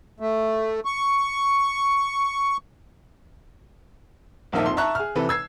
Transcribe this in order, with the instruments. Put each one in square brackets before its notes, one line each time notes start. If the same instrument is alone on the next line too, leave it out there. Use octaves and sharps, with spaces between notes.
[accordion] A3
C#6
[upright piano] D#1 A#1 F3 A#3 D#4 E5
F2 C6
E5 A5 A#5 C#6 F#6
G#4 F6
C3 E3 A4 B4
E6 G#6 C7